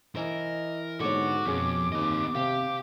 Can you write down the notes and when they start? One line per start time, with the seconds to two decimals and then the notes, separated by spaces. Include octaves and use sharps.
0.16 E3 A#4 C5 D#5
1.00 G#2 D3 B3 F#4 C#5 D6
1.46 F2 B2 C#4 G#4
1.92 D#2 C4 D#5
2.35 C3 G4 F5